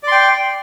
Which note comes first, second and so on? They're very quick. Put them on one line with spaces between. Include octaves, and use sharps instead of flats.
D5 C6 G5